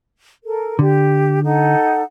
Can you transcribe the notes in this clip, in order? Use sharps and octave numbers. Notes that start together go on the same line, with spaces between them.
A4 A#4
D3 G4
D#4 A4 F#5